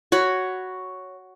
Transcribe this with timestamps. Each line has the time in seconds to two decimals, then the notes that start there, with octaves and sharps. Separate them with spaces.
0.12 F#4 C#5 B5